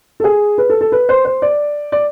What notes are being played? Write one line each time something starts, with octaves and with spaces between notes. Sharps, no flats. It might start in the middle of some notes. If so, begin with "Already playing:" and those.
A4
G#4
B4
A4
A4
B4
C5
C5
D5
D5